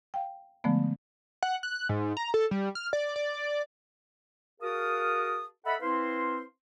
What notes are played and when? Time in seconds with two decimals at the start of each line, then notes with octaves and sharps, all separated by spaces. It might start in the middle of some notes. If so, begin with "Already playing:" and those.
0.14 F5 G5
0.64 D3 F3 G#3 A3 B3
1.43 F#5
1.63 F#6
1.89 G#2
2.17 A#5
2.34 A4
2.51 G3
2.75 F6
2.93 D5
3.16 D5
4.61 F#4 G#4 A#4 F5 A5 D#6
5.65 A4 D#5 E5 F#5 B5
5.80 C4 E4 B4 C5 F5 C6